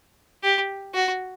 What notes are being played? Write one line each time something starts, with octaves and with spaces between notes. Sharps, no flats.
G4
F#4